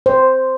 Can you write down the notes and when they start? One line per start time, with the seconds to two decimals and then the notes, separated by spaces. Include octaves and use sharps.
0.06 C5